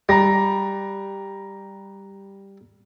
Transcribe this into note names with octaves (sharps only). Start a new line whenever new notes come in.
G3 A#5 A#6